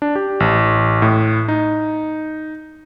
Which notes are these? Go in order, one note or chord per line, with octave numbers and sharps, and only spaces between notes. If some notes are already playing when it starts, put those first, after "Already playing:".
D4
G4
A1
A2
D#4